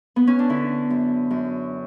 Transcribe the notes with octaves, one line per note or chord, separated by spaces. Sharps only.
B3
C#4
D4
D3 E4
F#2
F#2